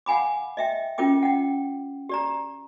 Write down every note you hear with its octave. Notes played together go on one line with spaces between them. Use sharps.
F5 F#5 G#5 B5 D6
D#5 E5 G5
C#4 F4 A#4 G5 D6
F#5 G5
G4 D5 A#5